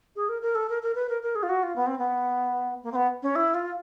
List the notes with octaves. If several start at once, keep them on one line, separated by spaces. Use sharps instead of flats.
G#4
A#4
A#4
A4
A#4
A#4
B4
A#4
A#4
G#4
F4
F#4
F4
B3
C4
B3
A#3
C4
B3
C#4
E4
F4